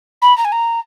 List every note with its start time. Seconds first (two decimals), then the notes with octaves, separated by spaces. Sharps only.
0.21 B5
0.37 A#5
0.44 G#5
0.52 A#5